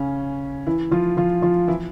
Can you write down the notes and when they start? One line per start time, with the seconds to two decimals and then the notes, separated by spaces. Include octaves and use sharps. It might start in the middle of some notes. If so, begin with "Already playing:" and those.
Already playing: C#3 C#4
0.67 E3 E4
0.91 F3 F4
1.17 F3 F4
1.42 F3 F4
1.68 E3 E4